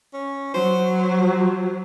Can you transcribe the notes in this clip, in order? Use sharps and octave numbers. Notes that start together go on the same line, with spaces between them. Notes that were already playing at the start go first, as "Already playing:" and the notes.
C#4
F#3 C5
C5